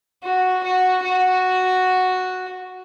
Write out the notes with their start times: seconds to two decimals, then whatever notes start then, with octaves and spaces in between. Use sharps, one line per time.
0.24 F#4
0.64 F#4
1.04 F#4